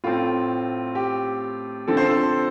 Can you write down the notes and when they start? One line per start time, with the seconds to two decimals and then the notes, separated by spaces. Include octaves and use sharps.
0.04 A2 A3 C4 F4
0.95 G4
1.87 D3 F3 C4 A4
1.97 C5
2.06 A4